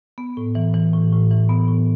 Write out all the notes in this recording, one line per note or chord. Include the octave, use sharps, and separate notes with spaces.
B3
A2
E3
E3
A2
A2
E3
B3
A2